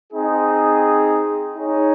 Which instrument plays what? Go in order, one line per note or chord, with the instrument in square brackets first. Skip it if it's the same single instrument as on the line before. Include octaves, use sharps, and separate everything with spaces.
[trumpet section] C4 D#4 G#4
D#4 G#4 C#5